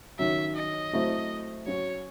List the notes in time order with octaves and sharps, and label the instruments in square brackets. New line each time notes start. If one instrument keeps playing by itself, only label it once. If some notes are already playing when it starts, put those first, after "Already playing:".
[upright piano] D#3 F#3 C#4 [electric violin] E5
[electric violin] D#5
[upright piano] F#3 A3 C4 E4
[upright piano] F#3 C#4 F#4 [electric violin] C#5